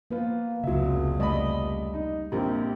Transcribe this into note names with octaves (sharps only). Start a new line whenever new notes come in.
F3 A#3 B3 F4
F1 C#2 C#3 F#3 E5
G3 A3 D5 D#5 B5
D#4
A#1 F3 C4 G4 A#4